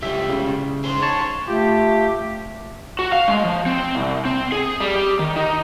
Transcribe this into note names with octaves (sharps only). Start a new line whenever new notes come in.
C#2 G3 E5
C#3
G#4 C5
C#5 A5 C#6
A3 F4 G4
F#4
F5
G#3
F3
C4
C2
C4
G#4
G3
G4
D#3
D#4